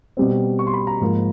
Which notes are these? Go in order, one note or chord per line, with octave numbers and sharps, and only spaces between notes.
B2 G3 C4
C#6
C6
B5
A#5
G#2 F3 A#3